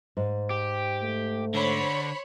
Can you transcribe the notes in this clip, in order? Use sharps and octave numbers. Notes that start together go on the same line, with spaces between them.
G#2
G4
A3
D3 C5 C#5 B5